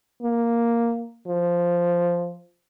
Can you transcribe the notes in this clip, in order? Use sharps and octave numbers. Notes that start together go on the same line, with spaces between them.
A#3
F3